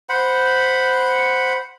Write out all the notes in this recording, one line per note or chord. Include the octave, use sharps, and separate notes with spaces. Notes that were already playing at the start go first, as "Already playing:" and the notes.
C5 F#5 B5